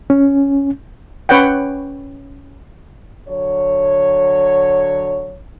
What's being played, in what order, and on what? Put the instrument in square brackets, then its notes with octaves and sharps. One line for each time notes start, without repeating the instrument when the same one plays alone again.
[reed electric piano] C#4
[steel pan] C#4 B4 C#5 F#5 G5
[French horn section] D3 F#3 C#5